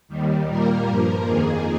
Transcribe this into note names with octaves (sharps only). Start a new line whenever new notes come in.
D#2 D#3 G3
A#2 G3 A#3 A#4
G2 F3 A#3
F2 D#3 A#3 G#4